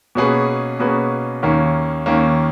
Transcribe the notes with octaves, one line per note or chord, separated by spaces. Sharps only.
B2 A#3 C#4 G#4 B4
B2 A#3 C#4 G#4 B4
D#2 D#3 A#3 C#4
D#2 D#3 A#3 C#4